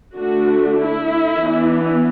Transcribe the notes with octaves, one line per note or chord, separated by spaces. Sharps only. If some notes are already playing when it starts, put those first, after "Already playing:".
D3 A3 D4 F#4
E4
E3 B3 D4